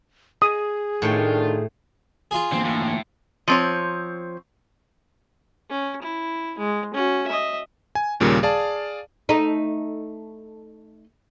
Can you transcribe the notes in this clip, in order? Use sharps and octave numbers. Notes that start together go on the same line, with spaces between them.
G#4 D#6
A2 D#3 A3 D4 F4 G5
F4 G#4
D3 E3 A#3 C4
A2
F3 C4 C#5
C#4
E4
G#3
C#4 F#4
D#5 E5
G#5
D#2 A#2 C#3 G3 A#3
G#4 D5 F5 A5
A3 D#4